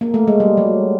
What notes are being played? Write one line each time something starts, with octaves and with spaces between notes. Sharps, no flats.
A#3
A3
G#3
G3
F#3